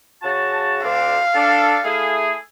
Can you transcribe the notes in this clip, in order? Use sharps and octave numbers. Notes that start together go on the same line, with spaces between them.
C#3 F#4 A5
D2 C4 D4 F5
D4 A4
A3 E4 G#4